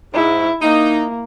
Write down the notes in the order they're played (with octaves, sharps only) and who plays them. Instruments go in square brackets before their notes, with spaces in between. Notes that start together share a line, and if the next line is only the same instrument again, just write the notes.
[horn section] G#2 [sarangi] E4
[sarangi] A#3 [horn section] D#4